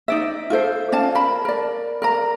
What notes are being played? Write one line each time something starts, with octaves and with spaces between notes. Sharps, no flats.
D#4 D5 E5
F4 A4 C5 E5
C#4 D5 F5 A5
A#4 B5
A#4 D5
A#4 D5 A#5